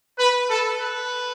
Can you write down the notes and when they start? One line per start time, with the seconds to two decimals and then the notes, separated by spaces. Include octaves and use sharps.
0.18 B4
0.49 A4
0.79 B4